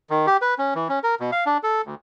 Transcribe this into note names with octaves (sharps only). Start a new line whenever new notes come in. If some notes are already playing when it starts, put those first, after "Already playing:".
D#3
G4
B4
C#4
E3
C#4
A#4
B2
F5
D4
A4
D2